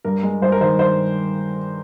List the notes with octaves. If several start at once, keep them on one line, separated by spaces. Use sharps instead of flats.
G2 A#4
G#3
G2 C5
A#4
D#3 C5
G2 C5